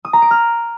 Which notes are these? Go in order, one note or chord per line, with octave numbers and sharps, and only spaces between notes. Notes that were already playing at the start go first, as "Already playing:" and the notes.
D#6
A#5
D7
F6